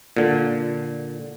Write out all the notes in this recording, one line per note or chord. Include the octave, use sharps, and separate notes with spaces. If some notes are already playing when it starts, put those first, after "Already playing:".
A#2 D3